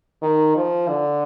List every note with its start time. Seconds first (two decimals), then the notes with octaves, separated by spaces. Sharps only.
0.22 D#3
0.56 F3
0.89 D3